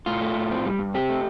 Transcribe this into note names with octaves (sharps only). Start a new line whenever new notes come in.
A2 F4
A3
A2
C4
G3
G2
C4 G4
A3